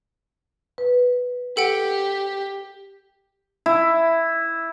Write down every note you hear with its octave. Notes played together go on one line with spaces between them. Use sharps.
B4
G4 A4 F#5 G5
E4